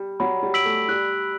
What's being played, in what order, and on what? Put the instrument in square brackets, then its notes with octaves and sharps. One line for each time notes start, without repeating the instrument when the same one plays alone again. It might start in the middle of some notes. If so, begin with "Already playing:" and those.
Already playing: [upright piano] G3
[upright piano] F#3 [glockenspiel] B5
[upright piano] G3
[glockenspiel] E6 B6 D7 F#7
[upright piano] A3
[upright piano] G3 [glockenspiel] F#6